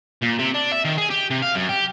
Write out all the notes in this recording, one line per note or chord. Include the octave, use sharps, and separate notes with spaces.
A#2
C3
D4
E5
D#3
G#4
G4
C3
F5
F#2
G4